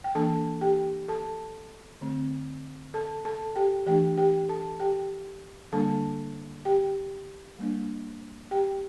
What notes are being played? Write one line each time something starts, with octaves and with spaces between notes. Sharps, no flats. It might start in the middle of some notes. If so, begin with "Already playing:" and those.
G5
E3 A#3 D4 A4 A5
G4 G5
A4 A5
D3 A3 C4
A4 A5
A4 A5
G4 G5
E3 A3 D4 G4 G5
G4 G5
A4 A5
G4 G5
D3 G3 A#3 D4 A4 A5
G4 G5
G3 A#3 D4
G4 G5